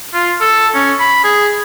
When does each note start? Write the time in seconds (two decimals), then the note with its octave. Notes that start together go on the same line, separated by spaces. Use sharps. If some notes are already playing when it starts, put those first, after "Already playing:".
0.14 F4
0.41 A4
0.75 C#4
1.00 B5
1.24 G#4